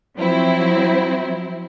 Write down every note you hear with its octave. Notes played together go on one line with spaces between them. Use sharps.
F3 F#3 C4 E4 C5